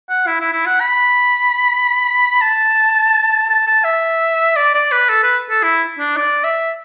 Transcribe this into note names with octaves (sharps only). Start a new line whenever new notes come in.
F#5
E4
E4
E4
F#5
B5
A5
A5
A5
E5
D5
D5
B4
A4
B4
A4
E4
D4
D5
E5